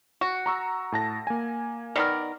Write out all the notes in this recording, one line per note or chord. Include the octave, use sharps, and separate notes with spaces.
F#4 C#6
A#5 C#6 E6
A2 A5 A#6
A#3 G#5
D#3 B3 A#4 D5